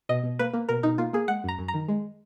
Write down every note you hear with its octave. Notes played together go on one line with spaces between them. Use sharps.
B2 D#5
B2
A#3 B4
A#3
B2 A#4
B2 D#4
A#3 F4
A#3 G#4
G#3 F#5
F#2 A#5
F#2
A#5
D#3
G#3